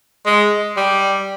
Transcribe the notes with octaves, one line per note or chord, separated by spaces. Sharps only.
G#3
G3